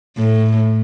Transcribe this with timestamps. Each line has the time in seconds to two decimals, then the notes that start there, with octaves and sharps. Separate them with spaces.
0.18 A2